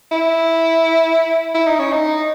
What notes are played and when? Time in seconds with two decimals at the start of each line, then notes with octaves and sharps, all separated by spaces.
0.12 E4
1.55 E4
1.67 D#4
1.79 C#4
1.92 D#4